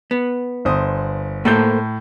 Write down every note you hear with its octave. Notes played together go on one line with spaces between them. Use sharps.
B3
G1 C5 D#6
A2 A#3 A4 C5 G6